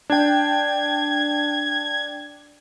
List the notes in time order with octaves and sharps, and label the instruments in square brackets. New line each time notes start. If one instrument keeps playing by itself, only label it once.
[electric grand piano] D4 G5 [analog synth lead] G#6